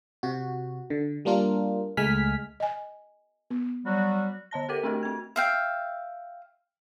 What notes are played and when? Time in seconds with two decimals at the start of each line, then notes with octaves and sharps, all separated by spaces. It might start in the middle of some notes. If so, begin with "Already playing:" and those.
0.23 C3 F#4
0.90 D3
1.25 G3 A#3 D4 F4 A#4
1.97 C#2 G#3 A3 G#5 F6 B6
2.60 D#5 G#5
3.50 B3
3.85 F#3 G3 F#4
4.51 D3 D#5 A5 A#6
4.69 G4 A4 A#4 D6 D#7
4.83 A3 C4 D4 F#4 G4 A#4
5.03 C4 G#6
5.36 E5 F5 G5